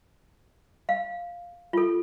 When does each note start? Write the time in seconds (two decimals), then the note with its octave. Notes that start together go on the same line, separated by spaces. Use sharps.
0.89 F5
1.73 F4 A4